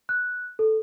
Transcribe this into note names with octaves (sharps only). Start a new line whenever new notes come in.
F#6
A4